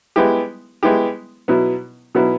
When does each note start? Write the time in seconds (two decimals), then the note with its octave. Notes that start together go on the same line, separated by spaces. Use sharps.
0.16 G#3 B3 E4 G4
0.83 G#3 B3 E4 G4
1.48 B2 F#3 B3 E4
2.15 B2 F#3 B3 E4